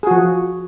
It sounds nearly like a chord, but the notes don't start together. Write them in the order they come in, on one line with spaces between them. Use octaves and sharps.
G#4 F#4 F3